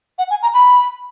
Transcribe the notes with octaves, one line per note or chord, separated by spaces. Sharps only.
F#5
G#5
A#5
B5